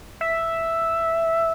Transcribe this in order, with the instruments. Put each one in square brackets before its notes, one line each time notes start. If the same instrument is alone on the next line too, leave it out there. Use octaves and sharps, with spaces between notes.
[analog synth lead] E5